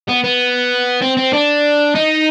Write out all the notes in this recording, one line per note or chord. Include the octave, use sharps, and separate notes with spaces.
B3
B3
C4
C4
D4
D#4